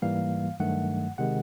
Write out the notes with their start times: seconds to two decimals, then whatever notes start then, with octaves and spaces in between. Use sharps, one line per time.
0.02 G#2 E3 G3 A#3 F5
0.60 G2 D#3 F#3 A3 F#5
1.18 C3 D#3 G#3 F#5